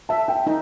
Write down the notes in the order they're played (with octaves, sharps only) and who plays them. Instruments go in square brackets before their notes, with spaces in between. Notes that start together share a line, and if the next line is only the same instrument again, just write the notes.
[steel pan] E5 [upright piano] A5
[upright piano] G5
[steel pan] D#4